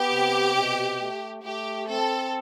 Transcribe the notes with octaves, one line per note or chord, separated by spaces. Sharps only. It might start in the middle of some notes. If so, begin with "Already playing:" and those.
Already playing: B3 G4
C3
B2
A3
A3 G4
C4 A4